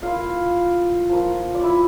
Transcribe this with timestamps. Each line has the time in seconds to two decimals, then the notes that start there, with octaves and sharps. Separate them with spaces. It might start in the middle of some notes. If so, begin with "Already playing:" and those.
0.02 A#3 E4 F4 F5
1.09 F3 A#3 F4
1.54 D5
1.63 E4 E5